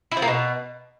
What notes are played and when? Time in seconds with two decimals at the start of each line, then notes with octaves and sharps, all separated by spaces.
0.11 E4
0.17 F3
0.22 A#3
0.28 B2